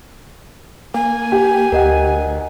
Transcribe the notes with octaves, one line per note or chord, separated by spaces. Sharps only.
A#3 G#5
G4
D2 A#4 D#5 F#5